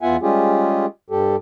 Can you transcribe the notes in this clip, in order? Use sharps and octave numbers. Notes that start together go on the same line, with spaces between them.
E2 B3 F4 E5 F#5 G#5
G3 G#3 C#4 F4 G4 G#4
G2 G3 G4 A4